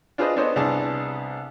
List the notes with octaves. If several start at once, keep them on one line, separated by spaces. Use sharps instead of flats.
D4 F4 G#4 B4 C5 D#5
B3 D4 A4 C5 C#5 D#5
C2 B3 D4 G#4 A5